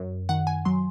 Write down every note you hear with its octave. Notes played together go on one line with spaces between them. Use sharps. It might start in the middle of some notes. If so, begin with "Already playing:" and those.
Already playing: F#2
D#3 F#5
G#5
F#3 C6